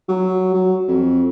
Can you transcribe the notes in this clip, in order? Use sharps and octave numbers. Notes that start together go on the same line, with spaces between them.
F#3
F#3
F2